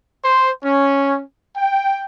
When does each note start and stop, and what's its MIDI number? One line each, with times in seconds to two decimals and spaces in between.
0.25 0.49 72
0.64 1.21 61
1.57 2.04 79